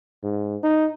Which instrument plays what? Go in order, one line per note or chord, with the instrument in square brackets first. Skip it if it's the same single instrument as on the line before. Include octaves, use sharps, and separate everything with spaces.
[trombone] G#2
D#4